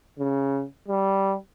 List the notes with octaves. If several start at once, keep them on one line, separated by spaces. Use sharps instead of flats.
C#3
G3